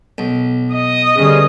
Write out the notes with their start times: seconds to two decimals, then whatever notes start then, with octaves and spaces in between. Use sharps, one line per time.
0.18 B1
0.73 D#5
1.16 D3 G3 B3 C#4 G#4